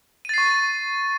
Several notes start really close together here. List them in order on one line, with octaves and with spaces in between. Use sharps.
D#7 A6 C7 C#6